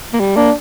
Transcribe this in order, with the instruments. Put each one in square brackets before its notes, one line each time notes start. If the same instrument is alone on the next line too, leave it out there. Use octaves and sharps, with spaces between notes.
[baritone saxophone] A#3
G3
[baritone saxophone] A#3 [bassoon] D4